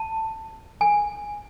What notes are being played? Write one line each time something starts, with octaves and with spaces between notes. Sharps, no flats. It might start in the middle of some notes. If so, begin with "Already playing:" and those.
Already playing: A5
G#5